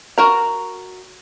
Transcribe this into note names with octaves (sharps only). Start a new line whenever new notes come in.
F#4 A#4 A#5